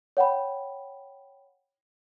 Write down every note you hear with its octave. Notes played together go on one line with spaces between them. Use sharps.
C#5 F#5 G5 B5